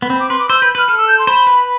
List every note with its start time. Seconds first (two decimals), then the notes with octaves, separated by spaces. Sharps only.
0.02 B3
0.10 C4 B5
0.20 D6
0.30 B4 C6
0.39 D6
0.49 C5 E6
0.59 B4 G6
0.75 B4 F6
0.88 A4 F6
0.98 E6
1.08 G6
1.19 C6
1.27 C5 B5
1.47 B4